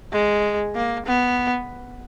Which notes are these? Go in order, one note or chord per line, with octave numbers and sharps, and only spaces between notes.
G#3
A#3
B3